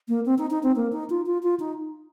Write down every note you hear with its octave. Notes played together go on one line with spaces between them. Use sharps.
A#3
C4
D#4
D#4
C4
A#3
D#4
F4
F4
F4
D#4